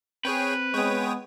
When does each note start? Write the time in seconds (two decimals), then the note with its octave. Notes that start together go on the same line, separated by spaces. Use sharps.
0.25 C4 G#4 B4 C#5 G5
0.74 G#3 B3 C#5 G5 D#6